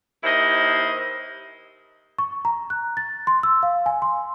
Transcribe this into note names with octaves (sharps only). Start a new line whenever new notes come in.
D#2 E4 C5 D#5
C#6
A#5
F#6
A6
C6
E6
F5
G#5
C6